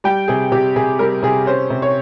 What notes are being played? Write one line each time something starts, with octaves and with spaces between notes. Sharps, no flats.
G3 G5
C3 G#4
C3 G4
C3 G#4
G3 A#4
C3 G#4
C#4 C5
C3
C#5